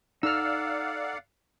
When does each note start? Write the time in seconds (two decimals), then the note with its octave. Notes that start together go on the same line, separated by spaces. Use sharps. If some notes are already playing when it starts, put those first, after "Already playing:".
0.23 D#4 A4 D5 F5 F#5 A#5 E6 F6